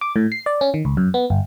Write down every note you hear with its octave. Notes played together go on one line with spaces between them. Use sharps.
D6
A2
C7
D5
C#4
D#3
C#2
F#2
B3
G1